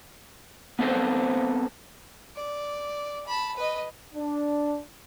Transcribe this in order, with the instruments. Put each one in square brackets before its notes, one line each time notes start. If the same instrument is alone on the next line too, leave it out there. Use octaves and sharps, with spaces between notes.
[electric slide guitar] B3 C4 A4 B4 C5
[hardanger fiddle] D5
A5 B5
B4 D#5
[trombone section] D4